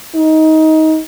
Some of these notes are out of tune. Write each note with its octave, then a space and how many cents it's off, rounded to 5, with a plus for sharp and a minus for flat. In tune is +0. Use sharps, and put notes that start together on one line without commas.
D#4 +20